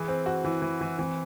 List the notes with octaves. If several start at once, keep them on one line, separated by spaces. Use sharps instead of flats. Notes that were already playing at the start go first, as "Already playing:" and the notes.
Already playing: E3 G#4
C4
F#4
E3 E4
E3
E3
E3 C4